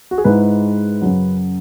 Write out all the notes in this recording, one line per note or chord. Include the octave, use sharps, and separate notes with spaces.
F#4
G#4
G#2 G#3 E4 B4
F#2 C#3 F#3